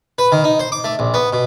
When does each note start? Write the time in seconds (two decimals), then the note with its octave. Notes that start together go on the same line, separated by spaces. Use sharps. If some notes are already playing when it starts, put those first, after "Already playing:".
0.18 B4
0.32 D#3
0.44 D#4
0.59 C5
0.72 D6
0.84 A3
0.99 A#1
1.14 B3
1.33 B2